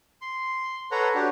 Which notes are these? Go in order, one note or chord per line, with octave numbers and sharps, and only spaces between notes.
C6
A4 B4 C#5 F#5 A#5
D4 F#4 G4